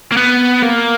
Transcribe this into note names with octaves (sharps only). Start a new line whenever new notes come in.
A#3
B3
A#3